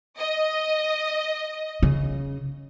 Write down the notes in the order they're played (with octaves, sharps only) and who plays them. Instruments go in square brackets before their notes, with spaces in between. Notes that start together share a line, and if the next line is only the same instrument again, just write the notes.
[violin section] D#5
[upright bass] C#3